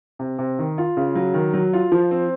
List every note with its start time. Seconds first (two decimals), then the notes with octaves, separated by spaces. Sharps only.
0.19 C3
0.39 C3
0.59 D#3
0.78 F4
0.97 C#3
1.15 F#3
1.34 D#3
1.54 F#3
1.73 F4
1.92 F3
2.11 C4